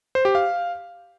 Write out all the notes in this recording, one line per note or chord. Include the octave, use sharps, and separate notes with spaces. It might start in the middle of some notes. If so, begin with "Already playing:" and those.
C5
G4
F5